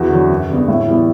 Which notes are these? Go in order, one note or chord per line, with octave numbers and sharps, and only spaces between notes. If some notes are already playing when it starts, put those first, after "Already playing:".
Already playing: E2 F#4
D3 F#3
F#2
D3 G3 B3
A2 E4
E3 G3 B3